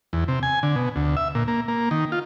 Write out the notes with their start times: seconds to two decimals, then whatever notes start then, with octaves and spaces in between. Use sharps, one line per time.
0.13 E2
0.28 C3
0.43 G#5
0.63 D3
0.76 B2
0.96 D2
1.17 E5
1.35 A#2
1.48 A#3
1.68 A#3
1.91 D#3
2.12 F4